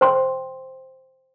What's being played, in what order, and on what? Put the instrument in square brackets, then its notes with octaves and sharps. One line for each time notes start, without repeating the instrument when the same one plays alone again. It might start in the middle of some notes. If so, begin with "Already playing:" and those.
[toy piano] C5 G5 C6